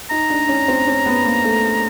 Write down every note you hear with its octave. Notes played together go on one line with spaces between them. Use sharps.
D#4 A#5
D4
C#4
C4
C#4
B3
A#3
A3